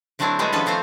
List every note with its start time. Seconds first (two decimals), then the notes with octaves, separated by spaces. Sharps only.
0.19 D3 F#3 A3 C4 D4 E4
0.39 G3 G#3 B3 F#4 G#4
0.53 D#3 F3 B3 C#4 A4 B4
0.66 A3 C4 F4 C5